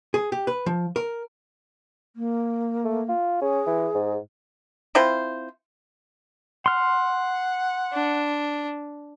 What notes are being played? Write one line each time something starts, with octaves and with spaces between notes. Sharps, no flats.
G#4
G4
B4
F3
A#4
A#3
A3
F4
C#4 G#4
E3
G#2
C4 E4 F4 C5
F#5 C6 F6
D4